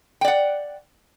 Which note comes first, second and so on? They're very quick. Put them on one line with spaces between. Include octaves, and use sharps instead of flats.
G5 D5 F#5